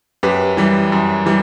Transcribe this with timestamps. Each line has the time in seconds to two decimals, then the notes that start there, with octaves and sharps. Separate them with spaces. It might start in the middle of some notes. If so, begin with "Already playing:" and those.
0.23 F#2 G4 B4
0.57 E3 G3
0.92 F#2
1.26 E3 G3